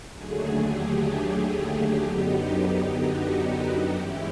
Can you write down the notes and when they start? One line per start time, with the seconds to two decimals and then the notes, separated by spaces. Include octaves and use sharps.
0.13 D#2 D3 F#3 A3 G#4
0.61 G4
1.08 G4
2.04 F#2 D3 F#3 B3 D#4
2.52 G4
2.99 F#4
3.94 G2 E3 G#3 C#4 E4 G4